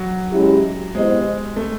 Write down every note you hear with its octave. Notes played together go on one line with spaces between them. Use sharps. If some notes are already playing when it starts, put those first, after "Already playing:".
Already playing: F#3
G#3 C#4 E4 G4
G#3 B3 E4 G4 C5 D#5
A3